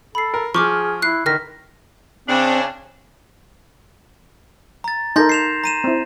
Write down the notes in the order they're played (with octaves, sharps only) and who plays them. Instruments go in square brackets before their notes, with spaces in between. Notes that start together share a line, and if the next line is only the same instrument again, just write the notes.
[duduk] A4 [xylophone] B5 C7
[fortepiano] A#4
[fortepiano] F3 [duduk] G#4 [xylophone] C#6 D6 F6
[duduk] E4 [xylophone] F#6 C7
[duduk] D3 [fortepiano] D#3 [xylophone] F6 A#6 B6
[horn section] C#3 D4 [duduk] C4
[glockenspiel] A#5 A6
[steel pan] D#4 A4 A#4 [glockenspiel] C6 G6 A#6
[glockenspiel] C7 E7 F7
A#5 D#7 E7
[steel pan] C4 E4